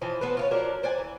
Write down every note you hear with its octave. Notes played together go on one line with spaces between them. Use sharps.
E3 F3 D#5
B3 C4 B4
C#4 E4 F4
F3 F#3 D4 A#4
C5 D5 F#5 G#5
E3